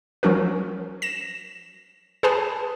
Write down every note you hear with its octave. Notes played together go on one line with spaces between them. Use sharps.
F3 F#3 C#4 F#4 A#4
A#6 E7
G#4 B4 G#5 A5 B5